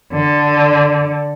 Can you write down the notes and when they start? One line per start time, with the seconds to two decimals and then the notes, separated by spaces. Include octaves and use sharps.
0.13 D3